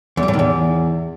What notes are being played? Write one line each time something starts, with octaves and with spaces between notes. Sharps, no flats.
E2
G3
A2
D#3
E2